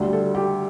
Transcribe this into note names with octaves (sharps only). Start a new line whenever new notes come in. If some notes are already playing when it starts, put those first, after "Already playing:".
Already playing: D2 D3 G3
A4
G4